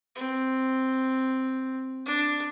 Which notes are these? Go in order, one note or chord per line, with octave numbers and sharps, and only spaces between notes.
C4
D4